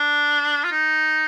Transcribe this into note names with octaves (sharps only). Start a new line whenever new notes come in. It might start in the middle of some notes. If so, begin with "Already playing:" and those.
Already playing: D4
F4
D#4